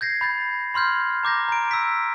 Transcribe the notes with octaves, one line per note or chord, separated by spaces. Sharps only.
G6 G#6 A#6 C7
B5 G6 A6
B5 C6 F6 G6 G#6
A#5 D6 G6 A#6
A#5 D7
E6 B6